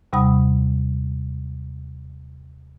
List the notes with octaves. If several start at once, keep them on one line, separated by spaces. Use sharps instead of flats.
D#2 C3 G3 F#5 B5 D#6